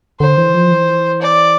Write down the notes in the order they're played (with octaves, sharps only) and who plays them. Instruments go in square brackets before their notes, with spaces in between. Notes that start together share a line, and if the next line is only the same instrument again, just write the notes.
[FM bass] D3 [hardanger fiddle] C5
[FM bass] E3
F3
E3
[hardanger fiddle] D5